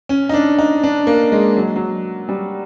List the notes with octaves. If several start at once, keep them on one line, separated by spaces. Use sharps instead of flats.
C#4
D#4
D4
D#4
D4
A#3
G#3
F#3
F#3
G3